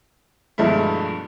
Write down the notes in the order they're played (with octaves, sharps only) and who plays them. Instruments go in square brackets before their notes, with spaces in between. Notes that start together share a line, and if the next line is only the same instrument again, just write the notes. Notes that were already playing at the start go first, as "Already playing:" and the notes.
[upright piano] G2 B2 F3 G#3 A3 E4